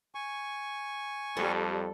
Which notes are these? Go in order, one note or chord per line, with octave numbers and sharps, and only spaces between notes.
G#5 C#6
F2 G3 A4